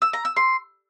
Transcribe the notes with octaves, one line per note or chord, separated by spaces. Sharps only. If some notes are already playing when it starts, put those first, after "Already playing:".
E6
A#5
E6
C6